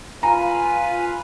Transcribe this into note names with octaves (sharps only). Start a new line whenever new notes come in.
F4 B4 F5 G#5 A#5